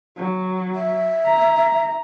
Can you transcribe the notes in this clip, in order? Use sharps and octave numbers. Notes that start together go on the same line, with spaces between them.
F#3
E5
A#5